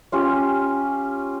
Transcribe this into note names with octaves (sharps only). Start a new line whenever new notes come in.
C#4 F4 G4